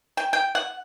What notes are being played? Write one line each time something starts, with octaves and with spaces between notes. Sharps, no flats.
G5
G5
F#5